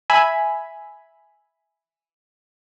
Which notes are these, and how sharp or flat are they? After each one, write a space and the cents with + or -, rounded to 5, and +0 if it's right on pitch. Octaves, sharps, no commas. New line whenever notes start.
E5 +0 G#5 +0 B5 +0